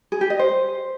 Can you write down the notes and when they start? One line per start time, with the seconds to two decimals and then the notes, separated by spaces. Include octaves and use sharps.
0.12 G#4
0.21 G4
0.30 D#5
0.39 C5